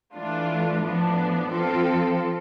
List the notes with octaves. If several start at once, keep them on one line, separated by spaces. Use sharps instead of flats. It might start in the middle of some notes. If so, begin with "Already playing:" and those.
E3 A3 D4 F4
A2 F3 B3 D4
F3 C4 F4 A4